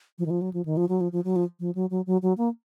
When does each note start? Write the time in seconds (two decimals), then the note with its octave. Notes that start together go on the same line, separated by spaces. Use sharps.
0.18 F3
0.26 D#3
0.30 F3
0.41 F#3
0.53 F3
0.65 D#3
0.77 F3
0.89 F#3
1.00 F3
1.12 F3
1.24 F#3
1.36 F3
1.60 F3
1.75 F#3
1.90 F#3
2.06 F#3
2.22 F#3
2.37 A#3